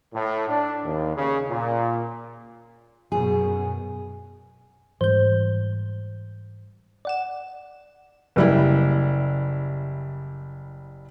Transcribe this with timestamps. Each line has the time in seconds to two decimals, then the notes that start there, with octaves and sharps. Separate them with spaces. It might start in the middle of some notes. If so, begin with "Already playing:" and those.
0.14 A2
0.49 D4
0.85 D#2
1.16 C#3
1.48 A#2
3.12 F#2 B2 G#4
5.01 G#2 E3 G3 C5 G6
7.05 D5 F#5 E7
8.36 F#1 G3 E4